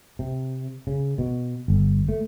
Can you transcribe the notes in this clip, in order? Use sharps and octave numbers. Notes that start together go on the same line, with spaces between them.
C3
C#3
B2
G1
A3